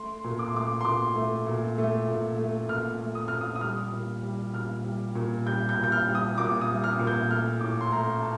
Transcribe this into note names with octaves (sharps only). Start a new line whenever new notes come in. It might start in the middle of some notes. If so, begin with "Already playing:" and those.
Already playing: A3 C6
A#2
D6
C6
A3 D6
C6
A#2 D6
A3
A#2
A3
A#2
A3
A#2 F6
A3
D#6
A#2 F6
D#6
D#6
G3 F6
A#2
G3
A#2 F6
G3
A#2
G3 G6
G6
A#2
G6
F6
G3
D#6
A#2 D6
D#6
G3
F6
A#2
G6
A3 F6
A2 D6
C6
A3 A#5
A5